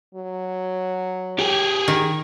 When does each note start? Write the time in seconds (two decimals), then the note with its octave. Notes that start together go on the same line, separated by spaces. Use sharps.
0.15 F#3
1.39 G4 G#4
1.88 D#3